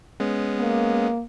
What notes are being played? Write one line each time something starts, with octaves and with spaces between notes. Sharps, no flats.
G#3 B3 C#4
A#3